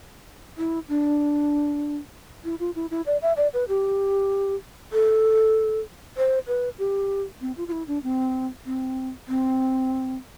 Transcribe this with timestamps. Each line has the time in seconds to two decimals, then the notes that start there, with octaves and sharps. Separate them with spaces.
0.57 E4
0.88 D4
2.44 E4
2.60 F4
2.75 E4
2.91 E4
3.06 D5
3.22 E5
3.37 D5
3.53 B4
3.68 G4
4.92 A4
6.17 C5
6.47 B4
6.79 G4
7.41 C4
7.57 F4
7.68 F4
7.72 E4
7.87 D4
8.03 C4
8.65 C4
9.28 C4